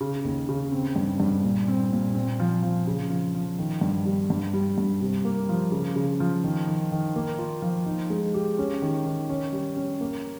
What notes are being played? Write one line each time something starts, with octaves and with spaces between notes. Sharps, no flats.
C#3
D#2
C#3
C4
G2
G2
A#2
C4
A#2
C4
F3
F3
C#3
F3
F3
D#3
G2
G3
G2
G3
G2
C3
A#3
F3
C#3
C#3
F3
D#3
D#3
D#3
A#3
F4
F3
D#4
G#3
G4
C#4
D#3
D#3
C#4
G3
C#4
A#3